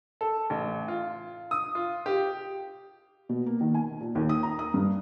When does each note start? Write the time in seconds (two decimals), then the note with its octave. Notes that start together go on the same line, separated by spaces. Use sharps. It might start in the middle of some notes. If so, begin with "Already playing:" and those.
0.21 A4
0.50 A1
0.88 F4
1.51 D#6
1.75 F4
2.06 G4
3.29 B2
3.46 A#3
3.61 D#3
3.74 G#5
4.01 A#2
4.15 D#2
4.29 D#6
4.43 A#5
4.59 D#6
4.74 G2